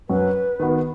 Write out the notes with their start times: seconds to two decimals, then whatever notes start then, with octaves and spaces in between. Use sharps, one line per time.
0.09 F#2 F#3 C#4 F#4 B4
0.60 D#3 B3 F#4